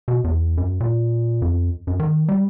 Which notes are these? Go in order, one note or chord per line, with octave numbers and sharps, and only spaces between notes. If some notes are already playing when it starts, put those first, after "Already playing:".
B2
E2
F#2
A#2
F2
F#2
D#3
G3